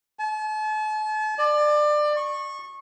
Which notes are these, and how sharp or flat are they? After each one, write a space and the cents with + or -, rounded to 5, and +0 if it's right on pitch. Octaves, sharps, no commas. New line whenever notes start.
A5 -40
D5 +25
C#6 -20